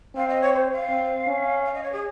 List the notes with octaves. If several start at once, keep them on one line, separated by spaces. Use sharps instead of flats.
C4 F5
D#5
C#5
C5
F5
C4
C#4
F5
D#5
C#5
G#4